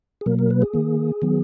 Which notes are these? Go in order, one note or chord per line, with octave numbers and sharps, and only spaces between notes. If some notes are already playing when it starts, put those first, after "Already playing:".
G#4
B2 F#3 A#3 A#4
A#4
B4
G#4
D#3 A#3
D#3 F#3 B3